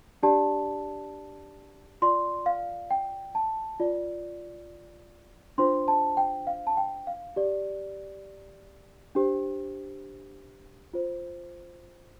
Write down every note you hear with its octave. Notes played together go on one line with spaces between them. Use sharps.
D4 G4 D5 A5
F4 D5 C6
F5
G5
A5
F4 D5
D4 F4 C5 C6
A5
G5
F5
A5
G5
F5
G4 D5
D4 G4 C5
F4 C5